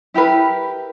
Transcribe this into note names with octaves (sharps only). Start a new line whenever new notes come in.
E4 G4 A#4 B4